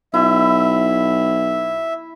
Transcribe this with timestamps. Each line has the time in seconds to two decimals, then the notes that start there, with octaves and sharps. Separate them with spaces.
0.14 B1 E4 E5